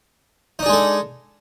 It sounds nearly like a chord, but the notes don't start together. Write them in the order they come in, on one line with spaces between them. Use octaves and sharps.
D#4 D4 G#4 G#3 A4